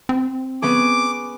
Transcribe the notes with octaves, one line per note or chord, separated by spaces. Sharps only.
C4
B3 C#4 G#4 D6